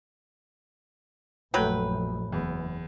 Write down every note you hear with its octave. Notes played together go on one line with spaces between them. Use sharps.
A#1 F#2 F#3 A3 B4 G5
F#1 E2